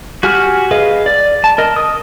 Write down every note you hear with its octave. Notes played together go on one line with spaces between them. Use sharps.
F#4 G4 G#5 F6
G#4 B4 D#5 F5
D5
A5
A#4 D#5
D#6